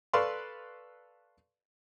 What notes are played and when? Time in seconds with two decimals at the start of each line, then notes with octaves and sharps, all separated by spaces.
0.13 A4 B4 D5 F5 C6 C#6